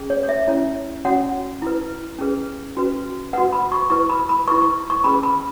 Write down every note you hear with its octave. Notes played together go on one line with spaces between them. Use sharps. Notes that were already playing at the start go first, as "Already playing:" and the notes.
Already playing: C#4 G#4
C#5
C#5
E5
C#4 E4 C#5
C#4 F#4 C#5 F#5
E4 B4
C#4 G#4 B4
C#4 F#4 B4
F#4 B4 F#5
B5
C#6
E4 B4 C#6
B5
B5
E4 B4 C#6
C#6
C#6
C#4 G#4 B4 B5
B5